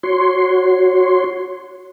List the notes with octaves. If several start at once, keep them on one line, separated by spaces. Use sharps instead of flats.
F#4 C#5 C6